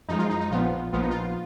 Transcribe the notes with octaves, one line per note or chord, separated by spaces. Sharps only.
F#2 F3 G#3 D#4
F4
D#4
D#4
A#1 A#2 F3 B3 F4
A#1 A#2 F3 B3 F4
D#4
F4